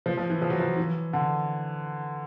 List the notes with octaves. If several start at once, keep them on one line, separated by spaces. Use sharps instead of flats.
F3
F3
E3
F3
F#3
F3
E3
D3